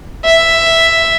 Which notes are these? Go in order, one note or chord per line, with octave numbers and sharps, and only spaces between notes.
E5